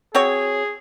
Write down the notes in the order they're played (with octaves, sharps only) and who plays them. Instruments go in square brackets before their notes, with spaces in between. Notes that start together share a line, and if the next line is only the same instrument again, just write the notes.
[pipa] C4 F#4 C#5 [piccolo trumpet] G#4